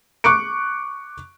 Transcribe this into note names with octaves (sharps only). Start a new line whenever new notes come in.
C#6 D6 F#6 C#7 D7